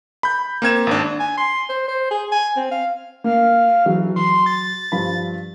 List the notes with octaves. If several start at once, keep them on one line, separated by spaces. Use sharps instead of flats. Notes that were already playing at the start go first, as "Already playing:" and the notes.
B5 G6
A#3 C4 G#6 E7
G#1 D4
G#5
C6
C5
C5
G#4
G#5
C4
F5
A#3 F5
E3 F#3 G#4
C6
A6
G2 F3 B5